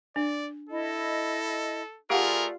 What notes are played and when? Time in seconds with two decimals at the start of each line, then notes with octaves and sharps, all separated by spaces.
0.16 D4 D5
0.69 E4 A4 D#5
2.10 A3 F4 G4 G#4 A#4 D5 F5 F#5